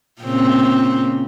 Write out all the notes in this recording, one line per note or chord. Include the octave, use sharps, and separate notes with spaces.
A#2 C#3 C4